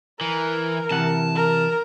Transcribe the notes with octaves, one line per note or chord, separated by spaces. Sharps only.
E3 A#4
C3 E3 F#5 A5
A#4